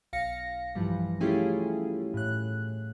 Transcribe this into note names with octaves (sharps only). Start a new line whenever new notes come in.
B1 F5 A#6 C#7
G2 E3 F3 G3
A3 C#4 E4 F4 G4 G#4
A2 F#6